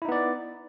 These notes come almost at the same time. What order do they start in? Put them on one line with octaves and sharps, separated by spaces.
E4 D#4 B3 D5